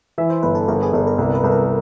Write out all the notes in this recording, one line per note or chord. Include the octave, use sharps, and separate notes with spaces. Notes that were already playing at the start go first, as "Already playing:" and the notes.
E3 E5
C5
G1 B4
A4
G1 A#4
G#4
G1 A4
A#4
C2 B4
B4
C2 A4
A#4